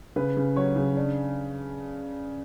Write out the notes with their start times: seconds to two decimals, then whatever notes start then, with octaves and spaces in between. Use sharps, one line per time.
0.16 C#3 B4
0.37 C#3
0.56 F#3 C#5
0.76 C#3
0.97 D4